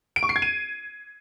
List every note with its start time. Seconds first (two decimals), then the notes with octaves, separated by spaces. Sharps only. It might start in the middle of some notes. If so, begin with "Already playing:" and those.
0.16 D7
0.23 C#6
0.29 C7
0.36 G#6
0.42 D#7